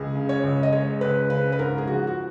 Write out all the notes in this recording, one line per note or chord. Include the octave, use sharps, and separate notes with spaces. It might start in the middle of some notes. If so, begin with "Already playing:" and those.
Already playing: C#2 G#4
C#3
C#5
C#2
D#5
G#3 C#5
C#2 B4
C#3 B4
B4
G#2 A#4
G#4
F3 F#4
F#4